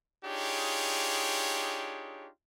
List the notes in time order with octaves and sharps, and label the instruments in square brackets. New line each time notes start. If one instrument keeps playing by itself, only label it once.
[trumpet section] D4 D#4 F4 G4 G#4 C#5